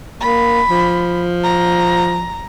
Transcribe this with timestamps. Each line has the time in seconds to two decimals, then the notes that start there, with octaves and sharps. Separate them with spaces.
0.21 A#3 B5
0.69 F3
1.44 A#5